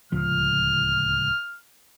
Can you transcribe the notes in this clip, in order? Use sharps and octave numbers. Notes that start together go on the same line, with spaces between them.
D1 C#2 F3 F6